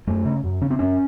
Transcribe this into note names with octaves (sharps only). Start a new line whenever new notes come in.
F#2 A3
C#3
F#2
C#3 C#4
C4
F#2 C#4